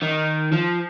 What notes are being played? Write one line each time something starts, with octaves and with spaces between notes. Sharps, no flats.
D#3
F3